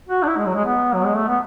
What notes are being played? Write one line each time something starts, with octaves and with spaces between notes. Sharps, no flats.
F#4
D4
E4
G#3
F#3
G#3
B3
F#3
G#3
A3
B3